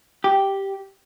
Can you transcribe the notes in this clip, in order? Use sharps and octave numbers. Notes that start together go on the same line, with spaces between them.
G4